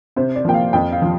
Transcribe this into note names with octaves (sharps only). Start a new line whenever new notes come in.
C3 C5
D5
F3 A#3 G5
F5
F2 G5
F5
F3